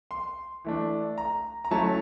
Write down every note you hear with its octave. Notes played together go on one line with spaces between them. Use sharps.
C6
E3 A3 D4
A#5
A#5
F#3 A3 C#4 E4 A5